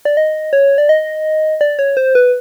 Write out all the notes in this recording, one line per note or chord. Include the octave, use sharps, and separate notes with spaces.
D5
D#5
C#5
D5
D#5
D5
C#5
C5
B4